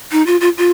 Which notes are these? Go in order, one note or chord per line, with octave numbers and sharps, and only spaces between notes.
D#4
F4
F4
F4